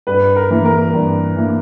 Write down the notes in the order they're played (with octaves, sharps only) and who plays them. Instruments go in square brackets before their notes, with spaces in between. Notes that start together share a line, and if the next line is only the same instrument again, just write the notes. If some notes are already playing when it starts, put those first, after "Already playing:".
[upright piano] G2 B4
A#4
E3 A#3
A#4
G2
E3 A#3